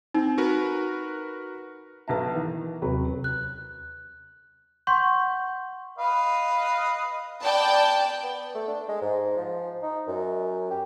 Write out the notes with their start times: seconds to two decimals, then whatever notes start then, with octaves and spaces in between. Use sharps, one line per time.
0.14 C4 D#4
0.38 F#4 A#4 B4
2.08 B1 B4 E5 A5 A#5
2.34 D#3 E3
2.82 D#2 C3 F#3 C4 B4
3.24 F#6
4.87 F#5 C6 C#6 G6
5.98 B4 D#5 F5
7.43 B3 D5 G5 A5
8.23 B3
8.55 A3
8.68 D4
8.88 G#3
9.01 G#2
9.37 F3
9.82 D#4
10.07 F#2
10.70 G4